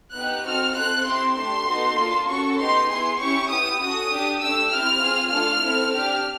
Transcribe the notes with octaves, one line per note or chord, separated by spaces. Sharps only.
B3 D#4 G4 F#6
C4 D#4 F#4 A4 F6
C4 F4 A4 F#6
C4 E4 G4 C6
A3 D4 G4 C6
B3 D#4 F#4 A4
A#3 D4 F4 A4
C#4 F#4 A4 C#6
B3 D#4 G4 C6
B3 E4 G#4 C6
C#4 E4 G4 C#6
B3 E4 G4 D#6
C#4 F#4 A4 D#6
D4 G4
A3 D4 G4 E6
C4 E4 G4 F6
C4 F4 G#4
A3 D4 F4 A4 F6
C4 E4 A4
D4 G4 F6